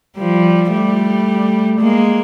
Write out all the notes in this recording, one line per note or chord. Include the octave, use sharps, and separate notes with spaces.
F3 G3
G3 A3
G#3 A#3